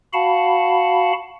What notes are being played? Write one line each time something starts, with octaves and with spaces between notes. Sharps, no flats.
F#4 F5 F#5 A5 B5